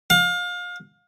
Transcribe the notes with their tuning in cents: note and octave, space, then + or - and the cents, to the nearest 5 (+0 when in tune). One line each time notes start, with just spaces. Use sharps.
F5 +30